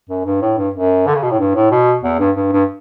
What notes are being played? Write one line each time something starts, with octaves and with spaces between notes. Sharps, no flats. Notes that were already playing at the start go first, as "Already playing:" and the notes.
F#2
G2
A2
G2
F#2
D3
C#3
B2
A2
G2
A2
B2
E2
G2
G2
G2